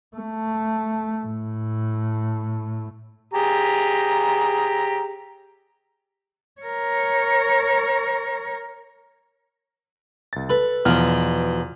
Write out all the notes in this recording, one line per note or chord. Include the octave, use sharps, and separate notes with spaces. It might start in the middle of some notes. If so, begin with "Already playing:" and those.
A3
A2
G4 G#4 A#5
A#4 C#5
C2 A6
A4 B4
E2 B2 F3 F6